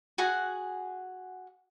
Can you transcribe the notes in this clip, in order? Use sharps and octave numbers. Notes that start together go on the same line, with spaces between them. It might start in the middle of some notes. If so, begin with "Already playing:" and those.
F#4 G#4 F#5 G#5